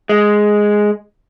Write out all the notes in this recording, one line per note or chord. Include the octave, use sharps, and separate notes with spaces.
G#3